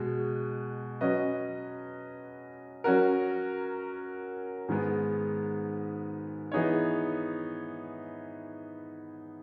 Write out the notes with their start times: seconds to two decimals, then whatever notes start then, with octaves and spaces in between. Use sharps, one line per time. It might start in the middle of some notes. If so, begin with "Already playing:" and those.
Already playing: B2 G#3 F#4
1.01 F#3 C#4 F#4 B4 D#5
2.84 F#3 C#4 F#4 A#4
4.68 G#2 D#3 G#3 B3
6.52 E3 B3 D#4 G#4 C#5